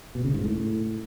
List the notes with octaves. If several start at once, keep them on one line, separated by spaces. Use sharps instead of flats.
B2
C#3
G#2
A2